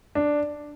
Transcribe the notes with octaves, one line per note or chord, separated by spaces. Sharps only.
D4